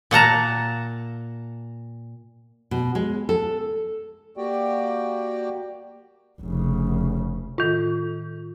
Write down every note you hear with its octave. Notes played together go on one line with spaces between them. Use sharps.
A#2 F#5 A5 A#5
B2
G#3
A4
A#3 F#4 G4 D5 G5
F1 C#3
A2 D#3 F4